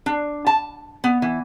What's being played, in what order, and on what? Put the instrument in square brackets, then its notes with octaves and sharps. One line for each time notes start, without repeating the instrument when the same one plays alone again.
[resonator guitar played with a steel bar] D4
A5
B3
E3